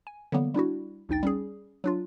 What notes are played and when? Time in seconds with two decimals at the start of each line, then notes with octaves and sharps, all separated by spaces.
0.07 G#5
0.32 D3 E3 F#3 G3 A#3 B3
0.54 G3 D4 E4 F#4
1.09 A#1 D#2 D#4 G5 A6
1.23 G3 C#4 G#4
1.84 F#3 D4 F4